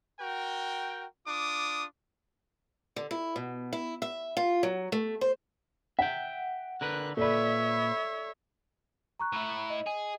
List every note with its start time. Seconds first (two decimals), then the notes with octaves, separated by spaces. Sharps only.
0.20 F#4 A#4 G5
1.27 D4 F4 D6 D#6
2.96 D3
3.11 E4
3.36 B2
3.73 E4
4.02 E5
4.37 F4
4.63 F#3
4.92 A3
5.21 C5
5.99 E5 F#5 G5
6.81 D3 A#4 B4 F#6
7.17 A#2 A4 B4 C#5 D5 E5 B5
9.20 A#5 C#6 F#6
9.33 A2 E4
9.70 D#5
9.87 G#4